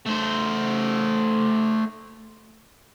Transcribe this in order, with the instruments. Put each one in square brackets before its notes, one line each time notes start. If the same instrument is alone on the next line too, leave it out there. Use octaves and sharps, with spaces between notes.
[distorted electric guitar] A3 C5